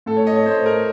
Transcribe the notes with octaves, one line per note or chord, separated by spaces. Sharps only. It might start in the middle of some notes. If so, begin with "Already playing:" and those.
A2 A4
C#5
D#5
C#5
A2 C5
A#4